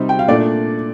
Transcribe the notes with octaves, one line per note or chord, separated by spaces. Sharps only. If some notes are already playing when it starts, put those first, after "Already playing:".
Already playing: C3 G3 C4 D#4 C5
G5
F5
A#2 A3 D4 D5